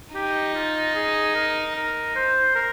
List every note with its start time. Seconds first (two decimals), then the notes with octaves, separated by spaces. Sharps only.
0.14 D#4 G4
0.54 F4
0.94 G#4
1.35 A#4
1.76 A#4
2.15 C5
2.55 A#4